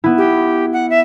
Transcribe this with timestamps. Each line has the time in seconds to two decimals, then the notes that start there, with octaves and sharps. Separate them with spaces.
0.04 B3 E4
0.18 G4
0.73 F#5
0.90 E5